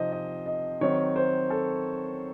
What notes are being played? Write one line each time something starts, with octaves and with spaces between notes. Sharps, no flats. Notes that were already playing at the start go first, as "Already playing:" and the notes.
Already playing: C3 F3 C4 D#4 C5 D#5
D#5
D#5
D#3 F#3 C4 D#4 C#5
C5
A4